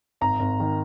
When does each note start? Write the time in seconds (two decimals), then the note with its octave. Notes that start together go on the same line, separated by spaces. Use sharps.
0.21 G#1 A#5
0.40 G#1
0.60 D#3